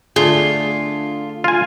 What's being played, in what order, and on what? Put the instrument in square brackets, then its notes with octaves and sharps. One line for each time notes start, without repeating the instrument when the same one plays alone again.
[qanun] D3 A3 [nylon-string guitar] D4 G#4 [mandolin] F4
[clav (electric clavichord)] F4 G#5